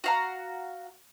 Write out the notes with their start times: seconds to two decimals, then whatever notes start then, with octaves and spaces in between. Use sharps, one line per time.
0.04 F#4 F5 A#5